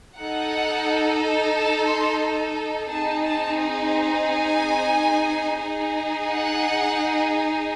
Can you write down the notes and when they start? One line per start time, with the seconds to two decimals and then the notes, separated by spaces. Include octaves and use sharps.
0.18 D#4 A4 F#5
1.54 A5
1.88 C6
2.89 C4 D#4 G#4 A5
3.24 A5
4.26 G#5
5.61 D#4 G#4
6.28 F#5